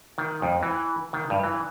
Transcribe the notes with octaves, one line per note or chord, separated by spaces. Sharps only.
D#3
F2
E3
D#3
G2
E3